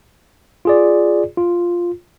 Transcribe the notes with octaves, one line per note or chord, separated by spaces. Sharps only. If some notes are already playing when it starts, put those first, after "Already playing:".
F4 G#4 D5
F4